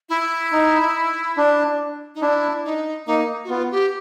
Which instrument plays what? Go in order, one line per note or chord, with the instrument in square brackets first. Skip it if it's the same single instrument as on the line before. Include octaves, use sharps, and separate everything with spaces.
[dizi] E4
[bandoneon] D#4
D4
[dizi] D#4
[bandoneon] D4 [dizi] E4
[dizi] D#4
[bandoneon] A#3 [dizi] D#4
[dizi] F#4
[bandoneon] B3 [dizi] F4
[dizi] G4